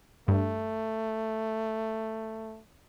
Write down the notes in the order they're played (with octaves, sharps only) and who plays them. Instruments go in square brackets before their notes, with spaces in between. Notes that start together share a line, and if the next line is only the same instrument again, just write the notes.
[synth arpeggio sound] G2 [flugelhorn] A3